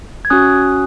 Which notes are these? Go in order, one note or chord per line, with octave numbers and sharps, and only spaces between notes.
G#6
C#4 F#4 D#6 F#6